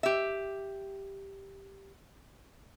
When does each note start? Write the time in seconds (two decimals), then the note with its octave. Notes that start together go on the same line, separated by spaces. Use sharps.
0.03 G4 E5